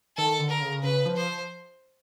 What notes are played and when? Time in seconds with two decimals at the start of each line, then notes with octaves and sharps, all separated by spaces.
0.17 D#3 A4
0.39 D3
0.50 A#4
0.62 C#3
0.83 C#3 B4
1.06 F3
1.17 C5